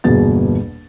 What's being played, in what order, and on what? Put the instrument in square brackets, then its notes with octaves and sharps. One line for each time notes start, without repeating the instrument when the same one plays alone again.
[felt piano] G1 E2 B2 A#3 G#4 A6